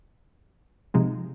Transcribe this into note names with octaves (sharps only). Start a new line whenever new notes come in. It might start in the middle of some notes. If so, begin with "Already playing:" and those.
C3 F3 G#3 C4 D#4